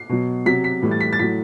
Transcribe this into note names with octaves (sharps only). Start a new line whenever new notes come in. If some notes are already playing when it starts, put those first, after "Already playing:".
Already playing: C7
B2 F#3
C3 F#3 B6
B6
A2 E3 G3
A6
B6
A6
A2 F#3 B6